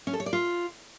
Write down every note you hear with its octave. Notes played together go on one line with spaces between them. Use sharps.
C#4
A4
C#5
D5
F4